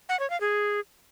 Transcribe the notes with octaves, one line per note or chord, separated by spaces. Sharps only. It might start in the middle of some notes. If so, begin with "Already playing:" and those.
F#5
C#5
F5
G#4